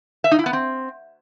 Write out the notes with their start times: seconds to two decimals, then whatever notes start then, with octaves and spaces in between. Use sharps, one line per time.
0.24 E5
0.31 D#4
0.39 E4
0.46 B3
0.53 C4